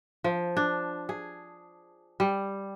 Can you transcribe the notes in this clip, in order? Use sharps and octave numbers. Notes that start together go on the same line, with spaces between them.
F3
D4
G#4
G3